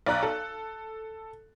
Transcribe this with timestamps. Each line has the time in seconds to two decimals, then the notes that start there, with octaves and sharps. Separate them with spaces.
0.06 B1 D5 A#5 F#6
0.23 A4